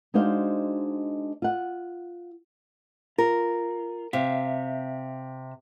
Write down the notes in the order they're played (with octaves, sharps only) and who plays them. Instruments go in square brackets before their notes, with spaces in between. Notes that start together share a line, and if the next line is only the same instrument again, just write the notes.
[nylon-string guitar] G#3 D4 D#4 F#4 C5 F5
F4 F#5
[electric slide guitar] F4 [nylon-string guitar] A#4
[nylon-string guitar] C3 [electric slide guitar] E5 F5